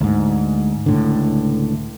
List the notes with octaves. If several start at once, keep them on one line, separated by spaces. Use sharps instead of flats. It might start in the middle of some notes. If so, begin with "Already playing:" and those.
D2 G#2
C#2 A2 D3